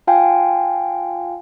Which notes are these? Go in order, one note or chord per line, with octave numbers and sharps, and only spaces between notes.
F4 F5 G5 G#5